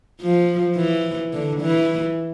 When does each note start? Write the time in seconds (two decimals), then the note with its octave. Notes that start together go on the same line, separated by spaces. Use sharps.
0.21 F3
0.76 E3
1.33 D3
1.60 E3